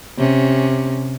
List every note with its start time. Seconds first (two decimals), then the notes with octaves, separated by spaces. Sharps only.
0.18 C3 C#4